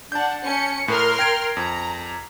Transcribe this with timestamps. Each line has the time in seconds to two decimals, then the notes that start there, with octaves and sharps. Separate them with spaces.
0.12 D4 F#5 A5 G6
0.44 C#4 C#7
0.88 A2 A#4 C6 F6
1.19 G5 G#6 D7
1.57 F2 A#5